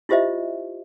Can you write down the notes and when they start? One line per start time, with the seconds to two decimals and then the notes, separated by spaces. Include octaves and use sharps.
0.09 E4 F4 G4 C5 D#5 E5